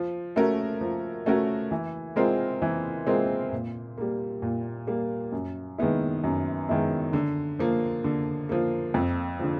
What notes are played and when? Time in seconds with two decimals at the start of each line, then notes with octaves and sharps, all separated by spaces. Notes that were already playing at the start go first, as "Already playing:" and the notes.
Already playing: F3
0.36 A3 C#4 F#4 A#4
0.81 F3
1.26 A3 C#4 F#4 A#4
1.71 E3
2.16 G#3 C4 F4 A#4
2.62 E3
3.07 G#3 C4 F4 A#4
3.52 A#2
3.98 G3 A#3
4.42 A#2
4.87 G3 A#3
5.32 F#2
5.78 D#3 G#3 B3 E4
6.24 F#2
6.69 D#3 G#3 B3 E4
7.13 D3
7.59 F3 A#3
8.04 D3
8.49 F3 A#3
8.94 F2
9.39 D3 F3